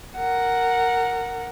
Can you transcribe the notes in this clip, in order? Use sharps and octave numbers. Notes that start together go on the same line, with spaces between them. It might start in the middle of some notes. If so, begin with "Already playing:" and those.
A#4 F#5